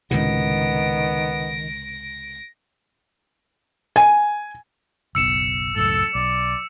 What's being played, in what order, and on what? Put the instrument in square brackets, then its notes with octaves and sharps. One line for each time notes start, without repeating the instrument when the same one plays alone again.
[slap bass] C#2 A2 C3 [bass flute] D#3 [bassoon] B3 [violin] A#6 D7
[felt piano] G#5
[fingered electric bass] F#1 B1 B2 [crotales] E6 C#7 E7
[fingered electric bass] C#2 F#2 A2 [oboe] A4
[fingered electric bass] B1 [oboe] D5